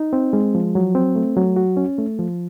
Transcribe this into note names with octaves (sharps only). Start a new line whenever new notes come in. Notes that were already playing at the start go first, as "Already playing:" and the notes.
Already playing: D#4
C4
G#3
F3
F#3
C4
A3
F#3
F#4
C#4
A3
F3